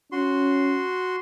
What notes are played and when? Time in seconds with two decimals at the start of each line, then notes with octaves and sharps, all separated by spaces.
0.12 C#4 F#4 C6